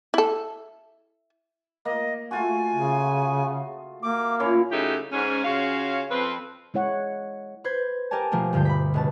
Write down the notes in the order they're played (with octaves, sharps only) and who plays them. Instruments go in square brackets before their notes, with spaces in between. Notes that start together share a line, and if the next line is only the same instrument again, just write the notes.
[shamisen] E4 A4
[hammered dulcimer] A#3 [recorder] D#5
[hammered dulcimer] A3 F4 F#4 [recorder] G#5
[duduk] C#3
[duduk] A#3 [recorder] D6
[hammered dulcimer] A#2 C#4 E4 [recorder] C#5
[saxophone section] C#3 F#3 A3 D#4 E4 G4
G#2 C#4
C#3 C#4 F4 F#4 C#5 F5
F2 C4 B4
[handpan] G#3 E4 C#5 F#5
[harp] B4 C5 G6 G#6
G4 A#4 D5 G#5 A5
B2 F3 A3 A#3 D4
D2 G2 D3 F4 G6
B5 B6
C#2 B2 A5